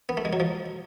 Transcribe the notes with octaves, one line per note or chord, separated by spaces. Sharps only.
B3
A3
G#3
F#3
F3